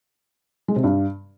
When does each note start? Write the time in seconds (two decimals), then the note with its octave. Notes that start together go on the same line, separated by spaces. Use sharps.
0.68 G#3
0.76 C3
0.84 G2